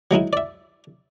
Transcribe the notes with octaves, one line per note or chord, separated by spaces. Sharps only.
F#3 G#3 D#4 E4
D5 E5